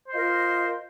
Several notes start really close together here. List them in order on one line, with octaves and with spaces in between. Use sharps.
C5 F4 D#5 A#4